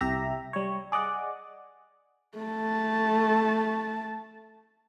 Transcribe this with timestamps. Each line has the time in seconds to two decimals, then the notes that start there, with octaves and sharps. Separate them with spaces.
0.01 C2 G4 E5 A#5
0.53 G3 C#5
0.92 G#4 D5 D#5 F#5
2.38 A3 A5